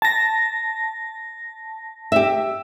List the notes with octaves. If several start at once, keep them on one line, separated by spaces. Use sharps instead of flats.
A5 A#6
G4 E5